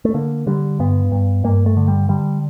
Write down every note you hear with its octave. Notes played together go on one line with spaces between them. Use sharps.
A3
D3 A#3
D3 G3
G2 B3
G2
G2 A#3
A3
D3
G3
D3 G3